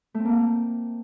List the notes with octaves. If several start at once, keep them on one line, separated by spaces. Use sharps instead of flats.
A3
C4
A#3